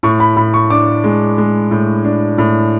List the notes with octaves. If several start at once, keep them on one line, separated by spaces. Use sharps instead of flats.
A2 C#6
B5
A2 B5
C#6
D4 D6
G#3
G#3
A2
D4
A2